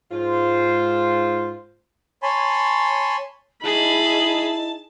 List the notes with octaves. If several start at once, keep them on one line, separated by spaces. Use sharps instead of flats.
G#2 F4 C5
C#5 G#5 A5 B5 C6
D#4 E4 G#4 A5 B5